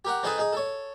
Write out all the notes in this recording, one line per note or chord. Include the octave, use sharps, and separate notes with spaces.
G4 A#4 F#5
C4 D#4 G#4 A4 B4
D#4 G#4
A4 C#5